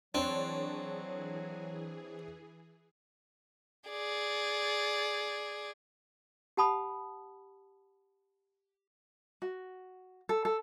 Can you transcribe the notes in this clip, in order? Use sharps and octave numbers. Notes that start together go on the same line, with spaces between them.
E3 F#3 C4 D4 G#4 C#5
G#4 D5
G4 F#5 A5 B5 D#6
F#4
A4
A4